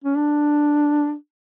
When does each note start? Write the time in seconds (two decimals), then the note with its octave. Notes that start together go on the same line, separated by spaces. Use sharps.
0.04 C#4
0.17 D4